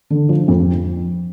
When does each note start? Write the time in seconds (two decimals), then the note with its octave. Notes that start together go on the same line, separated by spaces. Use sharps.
0.10 D3
0.29 F3
0.48 F2